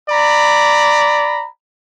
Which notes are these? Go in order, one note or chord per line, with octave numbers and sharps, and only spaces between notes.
D5 A#5 B5